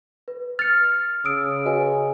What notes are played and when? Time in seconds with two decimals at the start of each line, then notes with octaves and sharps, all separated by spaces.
0.28 B4
0.59 F6 A6 C#7
1.25 C#3 D#6 E6 D7
1.65 F#4 B4 D#5 G#5